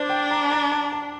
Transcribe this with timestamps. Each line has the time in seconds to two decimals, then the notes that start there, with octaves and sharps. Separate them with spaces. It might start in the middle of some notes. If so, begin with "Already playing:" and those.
Already playing: D4 C5 D5
0.10 G5
0.31 A#5
0.51 A#5
0.72 A5
0.92 A5